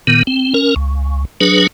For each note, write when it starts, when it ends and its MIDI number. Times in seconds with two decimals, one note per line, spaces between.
0.07 0.23 46
0.07 0.23 51
0.07 0.23 59
0.27 0.54 60
0.54 0.74 61
0.54 0.74 70
0.76 1.25 37
1.41 1.67 54
1.41 1.67 62
1.41 1.67 68
1.41 1.67 71